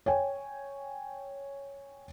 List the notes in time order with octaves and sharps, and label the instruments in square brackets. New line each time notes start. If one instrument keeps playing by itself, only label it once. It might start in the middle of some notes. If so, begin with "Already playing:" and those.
[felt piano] C#5 G5 G#5